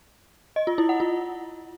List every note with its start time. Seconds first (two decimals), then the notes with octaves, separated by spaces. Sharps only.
0.56 D#5
0.67 F4
0.78 E4
0.89 F#5
1.00 F4